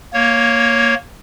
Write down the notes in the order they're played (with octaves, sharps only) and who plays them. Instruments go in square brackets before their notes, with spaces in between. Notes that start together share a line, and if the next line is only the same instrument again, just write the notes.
[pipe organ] A#3 C#5